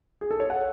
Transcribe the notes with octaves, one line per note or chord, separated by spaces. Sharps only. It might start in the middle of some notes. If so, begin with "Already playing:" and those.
G#4
A4
C#5
F#5